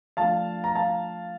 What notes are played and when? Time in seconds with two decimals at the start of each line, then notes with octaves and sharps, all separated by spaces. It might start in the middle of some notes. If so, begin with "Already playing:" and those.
0.17 F3 A3 D4 F5 A5
0.64 A#5
0.75 F5 A5